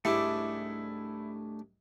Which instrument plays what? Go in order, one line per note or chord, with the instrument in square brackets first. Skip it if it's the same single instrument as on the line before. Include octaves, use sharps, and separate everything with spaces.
[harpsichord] C2 G#2 G4 [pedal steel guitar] A3 D4 D6 [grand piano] E4